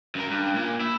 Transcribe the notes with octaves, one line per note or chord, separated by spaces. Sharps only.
F#2 A#4
G2
A#2
E4